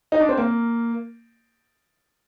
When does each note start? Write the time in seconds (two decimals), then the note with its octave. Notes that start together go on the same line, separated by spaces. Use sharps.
0.12 D#4
0.20 D4
0.29 C4
0.38 A#3